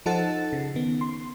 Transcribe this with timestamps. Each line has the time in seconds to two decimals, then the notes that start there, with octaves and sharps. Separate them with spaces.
0.06 F3 D#4 A4 C5 F#5 A6
0.53 C#3
0.75 D#3 B3
1.01 C6